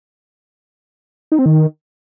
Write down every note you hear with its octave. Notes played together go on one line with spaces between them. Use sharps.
D#4
C4
D#3